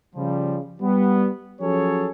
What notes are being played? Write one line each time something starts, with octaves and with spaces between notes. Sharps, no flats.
C#3 F3 G3
G3 B3
F3 F#3 C#4 G#4 A4 C#5